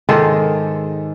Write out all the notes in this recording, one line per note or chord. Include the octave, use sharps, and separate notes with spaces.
G#2 D#3 G#3 A4